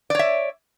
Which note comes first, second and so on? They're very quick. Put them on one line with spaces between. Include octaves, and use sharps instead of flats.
D5 C#5 E5